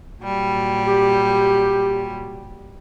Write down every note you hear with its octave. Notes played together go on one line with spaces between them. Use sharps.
A#2 F#3 G3
G4